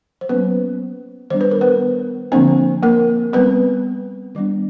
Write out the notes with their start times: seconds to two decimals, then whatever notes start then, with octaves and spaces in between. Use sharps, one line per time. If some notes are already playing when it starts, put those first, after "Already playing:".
0.21 C5
0.29 F#3 A#3 B3 C#4 B4
1.30 D#3 G3 B3 D4 C5
1.41 B4
1.51 A#4
1.61 B3 B4
2.32 D3 F3 A#3 C4 D4 C5
2.83 A#3 A#4
3.33 G3 B3 C4 B4
4.35 D#3 G3 B3 D4